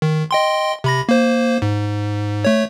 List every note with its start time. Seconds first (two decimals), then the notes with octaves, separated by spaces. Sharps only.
0.02 D#3
0.31 D#5 G5 C6
0.84 C3 B5 A#6
1.09 A#3 C5
1.62 G#2
2.45 A3 C#5